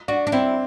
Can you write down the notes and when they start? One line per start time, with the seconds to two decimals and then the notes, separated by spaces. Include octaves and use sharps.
0.08 D4 F#4
0.27 D4
0.32 C4 E4